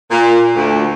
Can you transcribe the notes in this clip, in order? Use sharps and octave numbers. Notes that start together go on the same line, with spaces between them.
A#2
D2